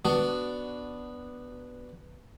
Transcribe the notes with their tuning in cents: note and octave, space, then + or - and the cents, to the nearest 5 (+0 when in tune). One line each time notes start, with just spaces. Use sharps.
B3 +0 D4 +0 F#4 +15